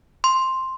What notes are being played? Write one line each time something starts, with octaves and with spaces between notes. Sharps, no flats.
C6